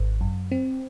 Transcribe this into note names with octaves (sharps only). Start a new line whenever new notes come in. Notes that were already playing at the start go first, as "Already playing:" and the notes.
Already playing: G#1
F#2
C4